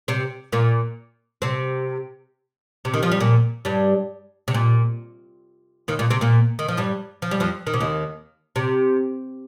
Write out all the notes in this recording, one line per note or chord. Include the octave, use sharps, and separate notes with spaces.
C3 C4
A#2 A#3
C3 C4
C3
D#3
F3
G3
A#2 A#3
G2 G3
C3
A#2
D#2 D#3
A#2 A#3
C3 C4
A#2 A#3
D#3
F3
G2 G3
F3
G3
F2 F3
D#3
C3
D#2 D#3
C3